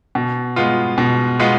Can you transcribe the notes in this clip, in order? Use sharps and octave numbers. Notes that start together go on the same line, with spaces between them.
B2
G#3 B3 F4
B2
G#3 B3 F4